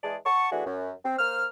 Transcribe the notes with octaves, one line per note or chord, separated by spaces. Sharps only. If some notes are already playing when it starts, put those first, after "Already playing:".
E3 G#3 G#4 D5 A5
F#5 A5 C#6
E3 A3 D4 F#4 G#4
F#2
C4
A#3 C5 F6